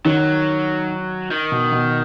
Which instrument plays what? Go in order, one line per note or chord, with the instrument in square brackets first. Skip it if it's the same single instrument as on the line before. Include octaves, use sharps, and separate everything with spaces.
[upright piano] D#3 [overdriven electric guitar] F#3
[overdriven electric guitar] D#3
[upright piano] B2
B2